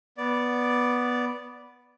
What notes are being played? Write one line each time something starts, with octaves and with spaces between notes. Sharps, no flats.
B3 D5